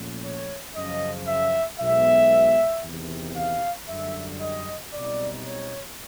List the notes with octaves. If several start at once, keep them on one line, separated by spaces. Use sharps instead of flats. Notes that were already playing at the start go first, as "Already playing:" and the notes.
Already playing: A#2 F3 A3 C#4
C#5
F#2 C#3 F3 D#5
E5
B1 B2 G#3 B3 E5
E2 C3 D#3
F5
F#2 D3 G3 E5
D#5
B1 B2 G3 C4 D#4 D5
C#5